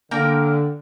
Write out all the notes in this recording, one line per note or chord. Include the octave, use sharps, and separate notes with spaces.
D3 A#3 A#4 G5